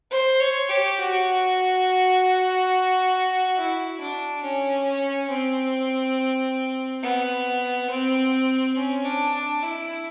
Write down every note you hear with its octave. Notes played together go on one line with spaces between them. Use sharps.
C5
C#5
G4
F#4
E4
D4
C#4
C4
B3
C4
C#4
D4
D4
E4